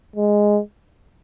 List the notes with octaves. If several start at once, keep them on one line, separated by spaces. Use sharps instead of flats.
G#3